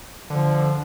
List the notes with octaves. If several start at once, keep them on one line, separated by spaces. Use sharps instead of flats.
D3 F3